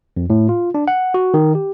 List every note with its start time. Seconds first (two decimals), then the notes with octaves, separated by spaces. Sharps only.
0.17 F2
0.30 A2
0.49 F4
0.74 D4
0.88 F#5
1.14 F#4
1.34 D#3
1.55 G4